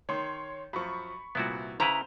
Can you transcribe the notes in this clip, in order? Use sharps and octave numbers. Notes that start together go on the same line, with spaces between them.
D#3 C#5 C6
F#2 F3 B5 C#6
C2 A#2 B3 E4 F#4
C#3 E4 B4 C5 A#5